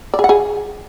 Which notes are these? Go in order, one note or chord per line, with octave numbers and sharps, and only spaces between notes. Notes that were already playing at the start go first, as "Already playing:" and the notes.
D5
G#4
F#5
G#4